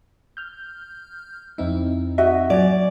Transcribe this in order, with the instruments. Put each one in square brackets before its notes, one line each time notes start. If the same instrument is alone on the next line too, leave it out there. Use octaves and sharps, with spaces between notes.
[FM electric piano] F6 G6
[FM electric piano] F2 C4 D#4 [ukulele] E4
[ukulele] F#4 D#5 E5
[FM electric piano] F#3 G#5 [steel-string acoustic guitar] D5